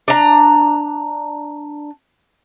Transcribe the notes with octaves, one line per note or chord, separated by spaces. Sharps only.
D4 A#5